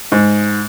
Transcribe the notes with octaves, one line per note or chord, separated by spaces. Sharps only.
G#2